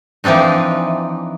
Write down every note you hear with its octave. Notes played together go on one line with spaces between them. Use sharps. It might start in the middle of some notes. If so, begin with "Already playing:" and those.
E3 F3 C4 D4 D#4